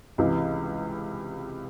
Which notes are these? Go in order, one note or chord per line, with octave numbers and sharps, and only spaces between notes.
C#2 C3 E3